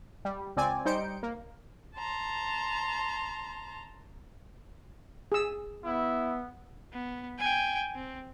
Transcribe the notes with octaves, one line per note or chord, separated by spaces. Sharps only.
G3
C#2 C4 D5 G#5
G3 D#4 C5 G6 C#7 D7
A#3
A5 A#5 C6
G#4 E6
B3 E4
B3
G5 G#5
C4